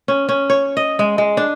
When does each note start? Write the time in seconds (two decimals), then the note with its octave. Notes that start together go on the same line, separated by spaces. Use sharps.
0.08 C#4
0.29 C#4
0.50 C#5
0.77 D#5
0.99 G#3
1.18 G#3
1.37 D4